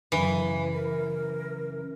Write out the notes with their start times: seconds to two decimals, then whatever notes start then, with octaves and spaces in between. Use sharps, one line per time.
0.12 F#2 C#3 E3 F5
0.74 A#4